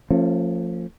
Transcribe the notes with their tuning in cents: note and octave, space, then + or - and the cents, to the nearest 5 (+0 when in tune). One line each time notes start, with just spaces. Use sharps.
F3 +0 A3 +40 C#4 -20